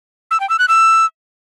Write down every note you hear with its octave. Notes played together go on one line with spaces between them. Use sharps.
E6
G5
E6
F#6
E6